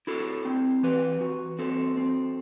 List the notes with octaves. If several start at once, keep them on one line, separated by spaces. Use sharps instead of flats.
E4 F#4 A4
C4
E3 G4 B4
E3 F#4
C4 F#4 A4
C4